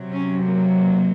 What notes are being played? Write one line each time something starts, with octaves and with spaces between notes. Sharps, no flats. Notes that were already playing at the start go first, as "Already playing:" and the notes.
Already playing: C3 F#3
C#4
A#3